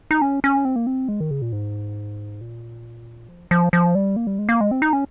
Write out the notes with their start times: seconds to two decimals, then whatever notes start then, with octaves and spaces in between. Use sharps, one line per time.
0.11 D#4
0.22 C#4
0.44 C#4
0.65 C4
0.76 A#3
0.87 C4
1.09 G#3
1.20 D#3
1.31 C#3
1.42 A#2
1.52 G#2
2.41 A#2
3.29 F3
3.51 F3
3.73 F3
3.95 G3
4.16 A#3
4.27 G3
4.39 G#3
4.49 A#3
4.61 G#3
4.71 C4
4.82 D#4
4.93 C#4